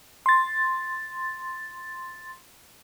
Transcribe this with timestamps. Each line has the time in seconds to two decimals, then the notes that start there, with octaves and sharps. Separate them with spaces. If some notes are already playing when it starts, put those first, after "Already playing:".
0.26 C6 A6